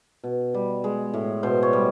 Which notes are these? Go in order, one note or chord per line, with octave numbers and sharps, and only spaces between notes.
B2
G3
G#3
A2
B2 C5
C#5
G3